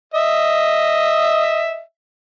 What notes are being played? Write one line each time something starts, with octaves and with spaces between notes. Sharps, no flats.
D#5 E5